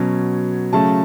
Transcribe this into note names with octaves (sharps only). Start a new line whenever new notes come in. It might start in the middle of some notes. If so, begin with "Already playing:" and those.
Already playing: B2 F#3 C#4
C#3 F#3 A3 A5